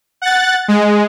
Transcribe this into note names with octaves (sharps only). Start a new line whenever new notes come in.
F#5 F#6 A6
G#3